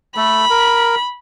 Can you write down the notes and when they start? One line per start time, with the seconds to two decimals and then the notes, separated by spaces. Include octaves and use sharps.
0.17 A3 A4 B5
0.50 A#4